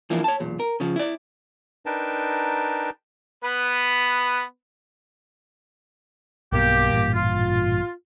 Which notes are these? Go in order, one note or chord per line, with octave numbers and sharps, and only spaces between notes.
E3 F3 A#3 D4 E4
C#5 A5
B1 E2 A#2
A#4
C#3 F3
E4 D5
D4 D#4 A#4 B4 G5 A5
B3 B4
B1 G2 B2 A#3 G4
A1 G2 A#2
F4